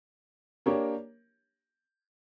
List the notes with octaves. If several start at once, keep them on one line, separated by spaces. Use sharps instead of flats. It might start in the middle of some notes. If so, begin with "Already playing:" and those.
A#3 D4 G4 A#4 C#5